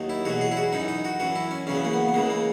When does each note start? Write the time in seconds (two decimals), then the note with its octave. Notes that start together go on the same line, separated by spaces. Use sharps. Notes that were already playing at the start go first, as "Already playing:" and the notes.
Already playing: D#2 D#3 F#3
0.10 E4
0.25 E2 B2 F#3 F#4
0.41 G#4
0.52 E4
0.57 F#4
0.73 F#2 E3 D#4
0.88 D#4
1.05 F#4
1.20 F#2 E3 F#4
1.35 E4
1.51 C#4
1.67 E2 C#3 F#3 C#4
1.76 B3
1.85 A#3
1.94 B3
2.09 B3
2.14 C#2 C#3 E3 A#3
2.30 A#3